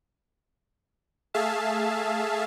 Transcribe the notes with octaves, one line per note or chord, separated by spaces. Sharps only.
A3 G#4 E5 F5 A5